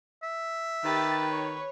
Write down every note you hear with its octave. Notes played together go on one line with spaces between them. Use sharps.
E5
D#3 G4 B4 A6
C#5